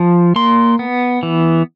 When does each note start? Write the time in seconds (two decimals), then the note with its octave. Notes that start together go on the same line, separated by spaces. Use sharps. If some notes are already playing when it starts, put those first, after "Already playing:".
Already playing: F3
0.36 A#3 C6
0.79 B3
1.23 E3